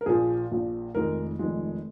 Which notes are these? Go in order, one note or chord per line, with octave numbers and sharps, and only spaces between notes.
A#4
A#1 A#2 F3 G#4
A#1 A#2 F3
F1 F2 D#3 G#3 A#4
F1 F2 D#3 G#3